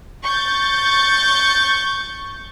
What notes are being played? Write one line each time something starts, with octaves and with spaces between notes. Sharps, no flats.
C#6 G6 A6